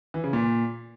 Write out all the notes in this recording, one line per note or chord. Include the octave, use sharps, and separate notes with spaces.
E3
C#3
A#2